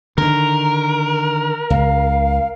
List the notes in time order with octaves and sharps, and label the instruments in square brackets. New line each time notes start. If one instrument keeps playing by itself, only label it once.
[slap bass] D3 D#3 [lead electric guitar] A#4
[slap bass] C#2 [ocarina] F5